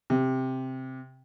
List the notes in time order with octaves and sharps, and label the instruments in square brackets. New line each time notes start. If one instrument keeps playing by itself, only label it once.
[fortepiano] C3